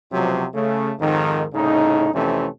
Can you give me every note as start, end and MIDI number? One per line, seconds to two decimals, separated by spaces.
0.12 0.43 37
0.12 0.43 48
0.12 0.43 53
0.12 0.43 54
0.54 0.92 49
0.54 0.92 57
0.99 1.44 41
0.99 1.44 44
0.99 1.44 51
1.53 2.09 36
1.53 2.09 45
1.53 2.09 49
1.53 2.09 63
2.13 2.47 41
2.13 2.47 48
2.13 2.47 52
2.13 2.47 57
2.13 2.47 61